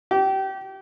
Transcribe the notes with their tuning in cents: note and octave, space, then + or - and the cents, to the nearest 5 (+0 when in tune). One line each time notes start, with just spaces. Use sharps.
G4 -30